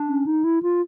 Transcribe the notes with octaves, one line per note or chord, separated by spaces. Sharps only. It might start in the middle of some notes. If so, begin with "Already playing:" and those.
Already playing: D4
C#4
D#4
E4
F4